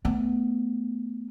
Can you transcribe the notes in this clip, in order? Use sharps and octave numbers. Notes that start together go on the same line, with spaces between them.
A3 B3